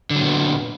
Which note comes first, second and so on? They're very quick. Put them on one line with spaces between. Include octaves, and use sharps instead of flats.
D3 F#3 A#2 B3